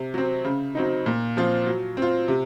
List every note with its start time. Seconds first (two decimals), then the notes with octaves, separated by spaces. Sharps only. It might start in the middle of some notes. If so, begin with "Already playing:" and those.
Already playing: C3
0.14 F#3 C4
0.44 C#3
0.75 F#3 C4 D#4
1.06 A#2
1.37 F3 C4 F4
1.67 F#3
1.97 C4 F4
2.28 C3